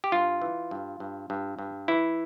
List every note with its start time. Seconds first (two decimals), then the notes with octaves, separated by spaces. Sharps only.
0.04 G4
0.12 G2 F4
0.42 E3
0.71 G2
1.00 G2
1.30 G2
1.59 G2
1.88 E3 E4